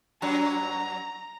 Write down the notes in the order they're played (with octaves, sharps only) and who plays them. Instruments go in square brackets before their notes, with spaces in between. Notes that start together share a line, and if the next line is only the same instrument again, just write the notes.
[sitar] F#2 F#3 [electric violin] A#5